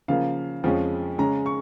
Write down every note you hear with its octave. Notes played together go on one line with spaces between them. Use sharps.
C#3 F3 A#3 F5
F2 F3 G#3 C#4
C#3 G#3 C#4 A#5
C#6